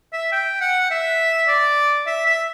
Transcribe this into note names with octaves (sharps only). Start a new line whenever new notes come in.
E5
G5
F#5
E5
D5
E5
E5